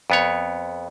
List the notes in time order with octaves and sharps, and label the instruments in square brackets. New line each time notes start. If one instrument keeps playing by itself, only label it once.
[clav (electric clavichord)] F2 B3 C#5